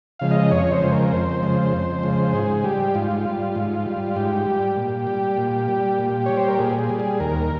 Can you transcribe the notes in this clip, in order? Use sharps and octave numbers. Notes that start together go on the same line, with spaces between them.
C#3 F3 G#3 F5
D#5
F2 C#5
C5
C#3 F3 G#3
A#4
F2 C5
C#3 F3 G#3
F2
C#3 F3 G#3
G#2 G#4
G3 G4
G#2 F4
G3
G#2
G3
G#2 G4
G3
A#2
G3
A#2
G3
A#2
G3 C#5
C5
A#4
A#2 G#4
G#4
G3
G#4
D#2 A#4